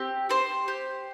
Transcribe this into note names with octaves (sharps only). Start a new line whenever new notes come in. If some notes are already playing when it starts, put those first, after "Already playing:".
Already playing: C4 G4
G4 C5
G4